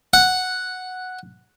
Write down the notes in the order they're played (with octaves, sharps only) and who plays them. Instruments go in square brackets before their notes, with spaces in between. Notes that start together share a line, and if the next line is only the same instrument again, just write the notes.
[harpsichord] F#5